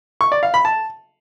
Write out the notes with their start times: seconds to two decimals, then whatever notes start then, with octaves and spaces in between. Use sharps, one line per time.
0.21 C#6
0.32 D5
0.43 F5
0.54 B5
0.65 A5